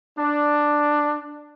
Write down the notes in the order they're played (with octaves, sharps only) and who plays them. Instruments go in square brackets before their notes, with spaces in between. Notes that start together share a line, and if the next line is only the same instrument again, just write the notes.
[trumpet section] D4